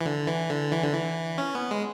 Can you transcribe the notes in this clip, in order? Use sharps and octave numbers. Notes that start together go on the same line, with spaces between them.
E3
D3
E3
D3
E3
D3
E3
C#4
B3
G#3